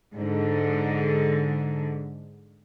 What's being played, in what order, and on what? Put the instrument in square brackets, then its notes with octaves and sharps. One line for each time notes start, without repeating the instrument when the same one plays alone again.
[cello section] G#2 D3